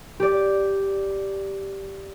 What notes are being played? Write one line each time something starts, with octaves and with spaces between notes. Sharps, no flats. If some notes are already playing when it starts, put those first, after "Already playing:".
G4 D5